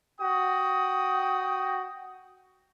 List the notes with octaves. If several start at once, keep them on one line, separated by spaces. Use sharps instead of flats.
F#4 G5 D#6